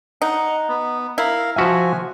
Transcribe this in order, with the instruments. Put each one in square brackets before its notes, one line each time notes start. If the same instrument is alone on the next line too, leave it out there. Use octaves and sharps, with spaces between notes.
[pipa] D#4 [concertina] F#5
[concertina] B3
[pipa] E4 [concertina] A#4 F5
[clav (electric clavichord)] F3 F#4 E5 [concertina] G#5